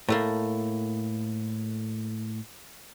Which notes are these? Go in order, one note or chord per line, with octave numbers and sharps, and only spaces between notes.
A2 A3 A#3